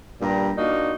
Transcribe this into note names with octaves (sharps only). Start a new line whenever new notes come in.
G2 A#2 G3 G4 A#5
A#3 D4 D#4 F4 F#4